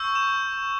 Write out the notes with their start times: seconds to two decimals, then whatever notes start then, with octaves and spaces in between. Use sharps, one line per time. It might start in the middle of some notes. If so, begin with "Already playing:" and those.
Already playing: C#6 E6 G6
0.15 E7